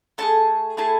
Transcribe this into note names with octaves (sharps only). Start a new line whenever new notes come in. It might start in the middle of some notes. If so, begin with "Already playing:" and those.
A3 E4 G#4 A5
A3 E4 G#4 A5